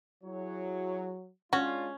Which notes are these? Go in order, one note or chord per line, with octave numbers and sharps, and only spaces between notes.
F#3 E4 G#4 C#5
G#3 C#4 D4 F4 F#4